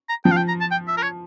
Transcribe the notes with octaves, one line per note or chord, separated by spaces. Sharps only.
A#5
F3 G5
F5
G5
A#5
A5
G5
E5
A#4
C#5